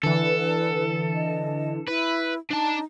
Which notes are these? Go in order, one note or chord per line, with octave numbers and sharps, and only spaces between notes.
D3 E3 A4 B4
D#5
E4 B4
D4 D#4 A5